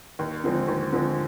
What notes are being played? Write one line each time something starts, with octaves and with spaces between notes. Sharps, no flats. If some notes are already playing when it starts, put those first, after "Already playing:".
D#2
D3 F3 G#3 C4
D#2
D3 F3 G#3 C4